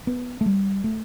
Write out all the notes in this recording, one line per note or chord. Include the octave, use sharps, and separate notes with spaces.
B3
A3
G3
A3